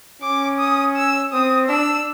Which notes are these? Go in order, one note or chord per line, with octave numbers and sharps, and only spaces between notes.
C#4 D6
D#6
E6
C4 D#6
D4 E6